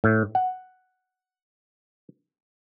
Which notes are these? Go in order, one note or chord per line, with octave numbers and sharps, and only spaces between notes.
A2
F#5